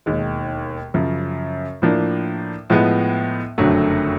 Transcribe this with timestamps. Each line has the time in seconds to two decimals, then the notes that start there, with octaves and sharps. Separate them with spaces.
0.06 E1 D#2 D#3 G#3
0.94 F#2 C#3 F3
1.82 A2 F3 A#3 D4
2.70 A2 F3 G#3 B3
3.58 F#1 F2 D3 F#3 A3